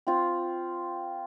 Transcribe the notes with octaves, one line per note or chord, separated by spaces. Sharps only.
C4 F4